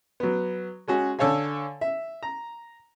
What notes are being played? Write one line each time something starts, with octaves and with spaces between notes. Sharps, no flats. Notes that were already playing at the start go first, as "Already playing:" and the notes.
F#3 B3
G#3 C#4 F#4 G#4
D3 A4 C#5 F5 G#5
E5
A#5